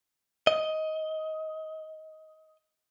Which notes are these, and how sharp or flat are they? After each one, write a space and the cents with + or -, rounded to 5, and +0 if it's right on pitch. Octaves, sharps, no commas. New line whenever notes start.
D#5 +15